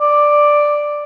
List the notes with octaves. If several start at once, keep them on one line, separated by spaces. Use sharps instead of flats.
D5